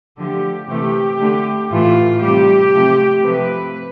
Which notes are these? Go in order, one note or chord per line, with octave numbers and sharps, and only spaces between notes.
D3 F3 A3 G4
C3 E3 A3 G4
D3 A3
A2 E3 A3 F4
C3 G3 G4
C3 F3 A3
C3 F3 A3 B4